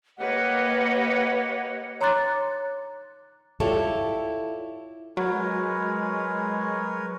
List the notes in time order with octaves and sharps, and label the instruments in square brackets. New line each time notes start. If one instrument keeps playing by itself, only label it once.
[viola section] A#3 G4 B4 [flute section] C#5 D#5 F#5
[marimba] C#5 A#5 C6 D6 F#6 A6
[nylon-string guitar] E4 F4 G4 A4 C#5 D5
[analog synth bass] F#3 [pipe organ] G#3 [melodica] A#4 B4 C#5